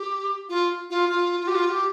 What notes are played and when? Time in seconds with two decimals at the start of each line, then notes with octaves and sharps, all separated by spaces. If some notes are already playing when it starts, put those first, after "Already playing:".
Already playing: G4
0.49 F4
0.90 F4
1.09 F4
1.40 F4
1.47 G4
1.54 F4
1.70 G4